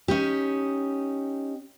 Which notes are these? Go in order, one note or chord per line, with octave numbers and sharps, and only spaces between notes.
C#4 D#4 G4